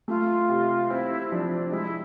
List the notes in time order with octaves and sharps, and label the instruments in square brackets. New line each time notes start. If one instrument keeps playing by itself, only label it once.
[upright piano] A3 [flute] F4
[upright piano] C3
[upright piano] C4 [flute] E4
[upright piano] F3 [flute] D4
[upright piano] G#3 [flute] E4